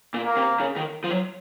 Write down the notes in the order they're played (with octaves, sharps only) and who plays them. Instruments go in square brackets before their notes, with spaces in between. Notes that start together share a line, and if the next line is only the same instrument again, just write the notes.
[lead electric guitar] A#2
[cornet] A#3
[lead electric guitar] C3
C#3
D#3
F3
F#3